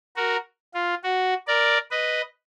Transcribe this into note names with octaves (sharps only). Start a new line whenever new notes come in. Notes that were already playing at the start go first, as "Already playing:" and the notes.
F#4 A#4
F4
F#4
A#4 D5
B4 D#5